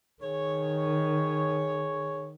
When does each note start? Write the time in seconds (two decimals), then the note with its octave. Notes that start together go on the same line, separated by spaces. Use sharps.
0.23 D#3 G#4 C#5